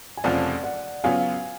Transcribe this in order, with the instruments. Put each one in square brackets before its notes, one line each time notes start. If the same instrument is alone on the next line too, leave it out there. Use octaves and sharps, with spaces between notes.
[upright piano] G#5
[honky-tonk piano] F1 F2 C#3 F3 [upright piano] D5 F#5
[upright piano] D5 F#5
[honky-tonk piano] C#3 F#3 B3 F4 [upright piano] F5 G#5